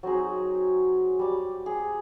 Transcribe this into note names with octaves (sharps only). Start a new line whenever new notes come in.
F#3 C4 D#4 G#4
G3 D6
G#4